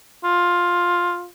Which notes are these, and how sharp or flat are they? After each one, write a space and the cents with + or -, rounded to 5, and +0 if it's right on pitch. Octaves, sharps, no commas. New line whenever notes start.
F4 +10